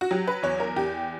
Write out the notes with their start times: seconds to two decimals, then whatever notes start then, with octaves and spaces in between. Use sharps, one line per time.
0.01 F#4
0.11 F#3 G4
0.27 B4
0.43 E2 C#5
0.60 A#4
0.76 E2 G4